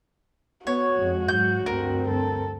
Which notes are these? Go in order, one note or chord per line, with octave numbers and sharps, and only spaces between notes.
B3 F#4 C#5
F2 G#3
G#2 F#3 G6
D2 G2 C4 A#4
A4